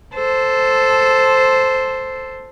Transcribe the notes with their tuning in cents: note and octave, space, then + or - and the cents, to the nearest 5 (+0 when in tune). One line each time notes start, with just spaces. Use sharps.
A4 +0 C5 +0